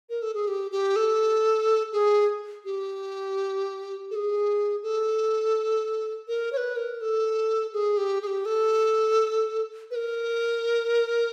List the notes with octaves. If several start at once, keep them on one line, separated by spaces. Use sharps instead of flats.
A#4
A4
G#4
G4
G4
A4
G#4
G4
A4
G#4
A4
A#4
C#5
B4
A#4
A4
G#4
G4
G#4
G4
A4
B4
A#4